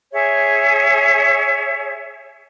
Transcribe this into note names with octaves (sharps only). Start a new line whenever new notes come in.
G#4 C#5 E5